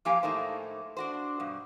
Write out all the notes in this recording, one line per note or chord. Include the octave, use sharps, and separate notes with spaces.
F3 A#3 G4 F5 G#5 A#5
A2 A3 A#3 D#4 C5
D4 F#4 C5
G2 B2